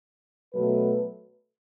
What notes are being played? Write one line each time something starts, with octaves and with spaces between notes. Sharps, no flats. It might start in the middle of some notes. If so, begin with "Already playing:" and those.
B2 F#3 A3 B4